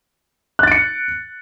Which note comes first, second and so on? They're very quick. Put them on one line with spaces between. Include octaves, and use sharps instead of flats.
F#6 A6 D7 C#7